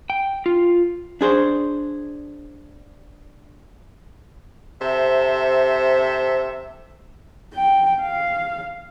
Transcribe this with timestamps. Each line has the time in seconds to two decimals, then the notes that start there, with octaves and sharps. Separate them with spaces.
0.10 G5
0.46 F4
1.21 D4 G#4 C5
4.81 C3 A4 C5 E5
7.54 G5
8.02 F5